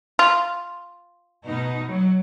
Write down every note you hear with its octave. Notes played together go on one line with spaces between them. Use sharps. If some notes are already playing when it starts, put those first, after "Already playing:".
F4
B2 D#4
F#3